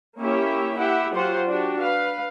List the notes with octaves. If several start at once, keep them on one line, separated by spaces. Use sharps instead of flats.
A#3 C#4 E4 G4 C#5 E5
E4 G4 E5 F#5
F#3 F4 G4 C5 F#5
D4 F#4 G4
B4 F5